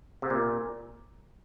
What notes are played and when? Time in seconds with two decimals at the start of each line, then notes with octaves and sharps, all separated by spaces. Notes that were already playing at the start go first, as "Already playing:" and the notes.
0.22 C3
0.30 A#2